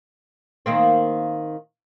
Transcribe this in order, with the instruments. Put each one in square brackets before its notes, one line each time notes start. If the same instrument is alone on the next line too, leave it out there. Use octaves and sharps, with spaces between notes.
[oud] D#3 A#3 C4